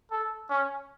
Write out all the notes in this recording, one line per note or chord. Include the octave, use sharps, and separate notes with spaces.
A4
C#4